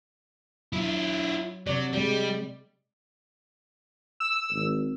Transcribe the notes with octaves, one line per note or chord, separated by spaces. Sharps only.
F#3 E4 F4
C3 F#3 D5
G3 G#3 D5
E6
G#1